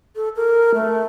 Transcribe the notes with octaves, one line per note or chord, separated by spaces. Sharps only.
A4
A#4
A3